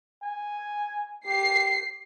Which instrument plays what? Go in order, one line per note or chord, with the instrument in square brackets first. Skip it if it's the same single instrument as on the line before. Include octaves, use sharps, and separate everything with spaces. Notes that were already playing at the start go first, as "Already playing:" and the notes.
[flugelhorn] G#5
[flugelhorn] G4 [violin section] C7